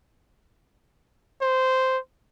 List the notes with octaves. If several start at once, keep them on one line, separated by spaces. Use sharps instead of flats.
C5